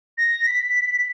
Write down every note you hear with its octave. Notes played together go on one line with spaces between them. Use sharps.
A#6
B6